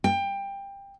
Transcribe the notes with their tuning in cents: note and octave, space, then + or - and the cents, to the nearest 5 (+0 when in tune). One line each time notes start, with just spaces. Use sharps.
G5 +20